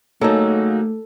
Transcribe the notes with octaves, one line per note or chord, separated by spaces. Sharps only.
C#3 F#3 A3 A#3 D#4 A4